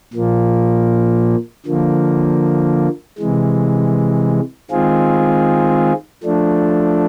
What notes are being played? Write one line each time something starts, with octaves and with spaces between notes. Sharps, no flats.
A#2 F3 A#3
D3 F3 A#3
C3 E3 G#3
D#3 G#3 C4 F4 G#4
F3 A3 D4